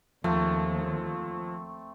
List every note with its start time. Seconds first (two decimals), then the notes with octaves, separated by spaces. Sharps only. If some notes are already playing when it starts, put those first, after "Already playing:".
0.24 D#2 F3 A3 C4